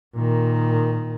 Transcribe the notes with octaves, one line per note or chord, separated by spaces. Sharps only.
A#2 D#3